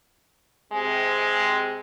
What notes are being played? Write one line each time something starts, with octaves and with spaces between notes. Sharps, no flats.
C3 G#3